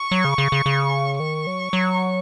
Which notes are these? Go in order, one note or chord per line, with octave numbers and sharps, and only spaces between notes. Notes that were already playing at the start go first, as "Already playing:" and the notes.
Already playing: C#6
F#3
C#3
C#3
C#3
C#3
D#3 C#6
F#3
F#3